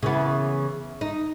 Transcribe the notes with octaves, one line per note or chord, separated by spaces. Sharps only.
C#3 E3 B3
D#4